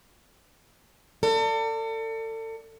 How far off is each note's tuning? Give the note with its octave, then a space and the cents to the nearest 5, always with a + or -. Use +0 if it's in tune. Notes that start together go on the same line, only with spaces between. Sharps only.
A4 +35 D5 +0